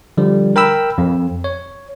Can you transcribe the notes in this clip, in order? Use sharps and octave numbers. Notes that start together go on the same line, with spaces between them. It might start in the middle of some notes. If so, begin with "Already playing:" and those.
D3 F3 G3
A#4 G5 B5 E6
F2
C#5